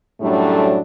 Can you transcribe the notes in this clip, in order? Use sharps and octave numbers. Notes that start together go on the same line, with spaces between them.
F#2 A2 F#3 G3 A3 D4